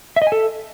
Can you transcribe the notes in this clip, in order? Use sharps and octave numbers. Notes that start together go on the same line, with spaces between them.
E5
D#5
G#5
A4